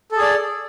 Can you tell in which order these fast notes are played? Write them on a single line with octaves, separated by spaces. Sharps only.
A4 G#4 D5